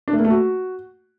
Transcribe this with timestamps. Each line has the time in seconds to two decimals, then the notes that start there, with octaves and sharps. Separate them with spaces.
0.08 D4
0.13 A3
0.19 A#3
0.24 A3
0.30 F#4